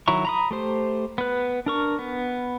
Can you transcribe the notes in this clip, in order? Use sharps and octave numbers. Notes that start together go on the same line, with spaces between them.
D#3 F#3 E4 A#5 C#6
A#5 B5 D#6
A3 G4 C5
B3 B4
D4 A#4 C#6
B3